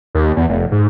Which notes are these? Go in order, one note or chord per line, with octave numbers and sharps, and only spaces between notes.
D#2
E2
F1
G#2